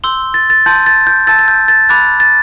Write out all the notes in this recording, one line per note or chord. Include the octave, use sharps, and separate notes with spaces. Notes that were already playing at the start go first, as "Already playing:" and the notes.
C6 E6 G6 G7
A6
A6
A5 C6 G6
A6
G6
A5 E6 G6 A6
A6
G6
A6
B5 D6 F#6 A6
A6